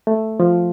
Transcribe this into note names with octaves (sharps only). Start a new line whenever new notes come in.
A3
F3